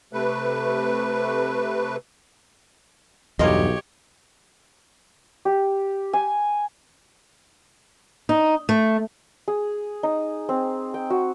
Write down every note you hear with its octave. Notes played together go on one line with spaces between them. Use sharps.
C3 A3 B4
B1 E2 G2 F4 G4 A#4 C#5 D#5
G4
G#5
D#4
A3
G#4
D#4
C4
G5
F#4